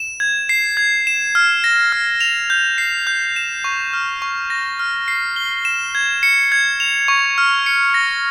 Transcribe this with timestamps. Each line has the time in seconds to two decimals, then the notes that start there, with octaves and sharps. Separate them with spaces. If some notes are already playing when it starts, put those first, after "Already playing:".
Already playing: E7
0.20 G#6
0.49 C7
0.77 G#6
1.07 E7
1.35 F6
1.64 A#6
1.92 F6
2.21 F7
2.50 G6
2.78 C7
3.07 G6
3.36 E7
3.64 C#6
3.93 F6
4.22 C#6
4.50 A#6
4.79 F6
5.08 C7
5.36 G7
5.65 E7
5.95 G#6
6.23 C#7
6.52 G#6
6.80 F7
7.08 C#6
7.38 F6
7.66 C#7
7.94 A#6